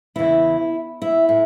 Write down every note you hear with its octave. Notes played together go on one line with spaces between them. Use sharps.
E2 C#3 E3 E4
E4
A2